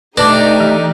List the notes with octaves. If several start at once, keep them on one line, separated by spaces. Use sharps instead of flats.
A3 D4 D#4 G4 B4 A5 D6
E3